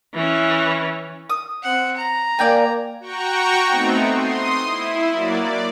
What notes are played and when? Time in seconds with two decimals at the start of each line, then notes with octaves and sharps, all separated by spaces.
0.14 E3 C#4
1.30 D#6
1.63 C4 F#5
1.97 A#5
2.39 A#3 D5 G5 G#5
3.00 F#4 G5 A#5 C#6
3.67 A3 B3 C4 D#4
4.16 C6 D#6
4.63 E4
5.11 F#3 A#3 D5
5.41 D5